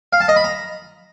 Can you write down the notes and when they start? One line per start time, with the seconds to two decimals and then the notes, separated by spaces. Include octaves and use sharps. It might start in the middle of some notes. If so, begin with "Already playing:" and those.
0.13 F5
0.20 A5
0.28 D#5
0.36 B5
0.44 A#5